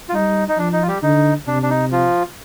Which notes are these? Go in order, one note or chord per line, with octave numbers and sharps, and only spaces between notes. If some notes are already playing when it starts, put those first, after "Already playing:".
F4
G3 D#4
D#4
F3 D4
D#4
F4
G3 G4
D3 D#4
C3 D4
D4
D#4
F3 F4